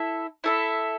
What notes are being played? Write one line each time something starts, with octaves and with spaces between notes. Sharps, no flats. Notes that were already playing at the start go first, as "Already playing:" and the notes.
Already playing: E4 A4 E5
E4 A4 E5